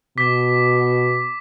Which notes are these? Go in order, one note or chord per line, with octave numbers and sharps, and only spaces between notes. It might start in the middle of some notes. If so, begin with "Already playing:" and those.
B2 D6 B6